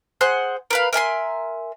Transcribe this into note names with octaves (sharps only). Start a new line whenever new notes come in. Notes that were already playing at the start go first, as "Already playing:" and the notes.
G#4 C5 F#5 F#6
A#4 B4 F5
A#4 E5 G#5 C6